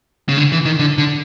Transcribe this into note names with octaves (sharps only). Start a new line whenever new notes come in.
C#3
D3
E3
D#3
D3
D3